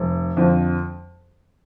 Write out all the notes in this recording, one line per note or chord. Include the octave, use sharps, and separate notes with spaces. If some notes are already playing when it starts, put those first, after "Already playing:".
Already playing: F1
F2 D3 F3